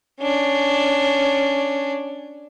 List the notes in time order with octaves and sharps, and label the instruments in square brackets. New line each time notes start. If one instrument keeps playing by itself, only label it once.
[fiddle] C#4 D4